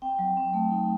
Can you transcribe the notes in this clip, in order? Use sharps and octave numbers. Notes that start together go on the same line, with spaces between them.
C4 G5
F#3
C4
A3
D#4